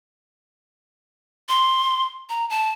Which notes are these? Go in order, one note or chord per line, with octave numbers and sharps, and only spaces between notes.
C6
A#5
A5